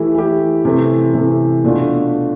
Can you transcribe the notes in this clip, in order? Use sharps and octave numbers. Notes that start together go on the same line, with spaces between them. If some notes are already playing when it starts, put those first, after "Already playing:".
Already playing: E3 A3 E4 G4
E3 A3 E4 G4
C3 E3 A3
C3 E3 A3
B2 A3 D4 F4